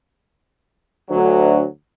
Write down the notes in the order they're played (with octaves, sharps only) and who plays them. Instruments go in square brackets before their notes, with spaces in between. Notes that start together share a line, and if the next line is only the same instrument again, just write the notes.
[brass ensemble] D2 F#3